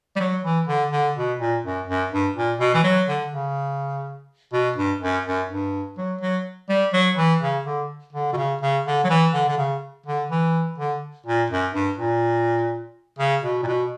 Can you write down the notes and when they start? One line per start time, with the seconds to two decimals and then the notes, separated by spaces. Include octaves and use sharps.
0.16 G3
0.20 F#3
0.44 E3
0.68 D3
0.92 D3
1.16 B2
1.40 A#2
1.64 F#2
1.87 F#2
2.12 G2
2.36 A#2
2.60 B2
2.74 E3
2.84 F#3
3.08 D3
3.32 C#3
4.53 B2
4.76 G2
5.01 F#2
5.25 F#2
5.49 G2
5.98 F#3
6.21 F#3
6.69 G3
6.93 F#3
7.17 E3
7.41 C#3
7.66 D3
8.13 D3
8.33 B2
8.37 C#3
8.62 C#3
8.86 D3
9.04 F#3
9.10 E3
9.33 D3
9.48 D3
9.58 C#3
10.06 D3
10.30 E3
10.78 D3
11.26 A#2
11.50 F#2
11.74 G2
11.98 A#2
13.19 C#3
13.42 B2
13.63 A#2
13.67 B2